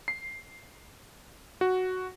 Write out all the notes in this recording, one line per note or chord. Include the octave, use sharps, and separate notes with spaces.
C7
F#4